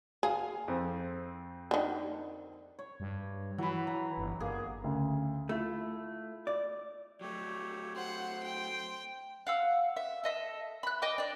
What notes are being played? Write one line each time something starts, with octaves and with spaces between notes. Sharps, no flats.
G#4 F5 G#5
F2 C4
D3 D#3
C#5
G2
E3 F#3 B5
F#3 A#5
G1
G1 A#3 G#4
D2 C#3
A3 E4 F4
D5
F#3 A3 G4 C#5
C5 F#5 C6
G5
F5 F#5 E6
E5
A4 D#5 E5
B5 F#6
D#5 G5 D6
D4 D5